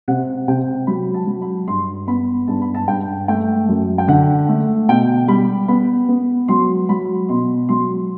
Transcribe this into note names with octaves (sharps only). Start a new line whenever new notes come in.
C3 F#5
C3 G5
F#3 B5
A5
F#3
B5
G2 C6
B3 B5
G2 A5
B5
A5
G2 G5
A3 G5
F#2
G5
D3 F#5
A3
B2 G5
G3 B5
B3 B5
B3
F#3 C6
F#3 B5
B2 C6
F#3 C6